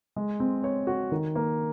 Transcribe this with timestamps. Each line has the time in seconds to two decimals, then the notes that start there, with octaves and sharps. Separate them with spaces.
0.16 G#3
0.40 C4
0.64 C#5
0.87 F#4
1.12 D#3
1.35 A#3